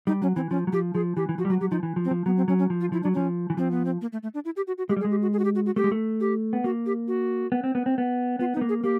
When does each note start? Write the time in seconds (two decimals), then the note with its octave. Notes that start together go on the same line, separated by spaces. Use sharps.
0.07 G3 D#4
0.22 F#3 C#4
0.36 E3 C4
0.50 F3 C#4
0.67 F#3
0.73 F3 G4
0.95 F3 G#4
1.17 E3 G4
1.29 E3
1.38 F3 F#4
1.45 G3
1.49 F#3 F#4
1.60 F#3 G4
1.71 F3 D#4
1.83 E3
1.96 F3
2.05 C4
2.11 F3
2.26 F#3 B3
2.37 C4
2.48 F#3 C#4
2.59 C#4
2.70 F3
2.81 F4
2.92 F3 E4
3.03 F#3 D4
3.14 F3 C#4
3.50 E3
3.57 F3 C4
3.71 B3
3.85 C4
4.01 A#3
4.13 A3
4.23 A3
4.34 D4
4.45 E4
4.57 G4
4.67 F#4
4.78 F#4
4.89 G#3 G4
4.97 G3
5.01 G#4
5.05 G#3
5.11 G4
5.22 F#4
5.33 G#4
5.39 F#4
5.44 G4
5.55 F#4
5.66 F#4
5.76 A3 G4
5.84 G#3
5.92 A3
6.21 G4
6.53 B3
6.64 A#3 F#4
6.86 G4
7.08 F#4
7.52 B3
7.64 C4
7.75 B3
7.86 C4
7.98 B3
8.39 B3 F4
8.54 D#4
8.57 B3
8.61 A#3
8.69 G#4
8.83 A#3 G4